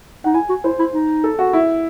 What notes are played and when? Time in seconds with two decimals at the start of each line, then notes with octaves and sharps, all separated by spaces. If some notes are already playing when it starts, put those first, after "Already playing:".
0.24 D#4 F#5
0.34 E4 G#5
0.49 F#4
0.64 E4 C5
0.79 E4
0.94 D#4
1.24 A4
1.39 F#4
1.53 E4